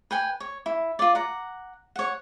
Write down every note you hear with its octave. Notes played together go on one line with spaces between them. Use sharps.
B4 G5 G#5
C#5
E4
F4 D5
F#5 A#5
C#5 F#5